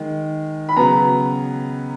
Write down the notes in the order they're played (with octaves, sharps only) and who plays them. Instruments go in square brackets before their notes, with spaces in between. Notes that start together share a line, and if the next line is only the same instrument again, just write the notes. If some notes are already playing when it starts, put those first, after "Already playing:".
Already playing: [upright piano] D#3 G#3
B5
C#3 F#3 B3 A#5